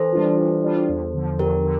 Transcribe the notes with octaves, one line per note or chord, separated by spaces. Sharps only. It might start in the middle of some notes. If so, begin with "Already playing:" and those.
Already playing: E3 A4 C5
G3 D4 F4
E3
G3 D4 F4
E2
D3 F3
E2 G4 A#4
D3